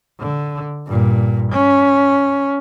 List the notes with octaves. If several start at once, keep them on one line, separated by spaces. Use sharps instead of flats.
D3
G2 A#2
C#4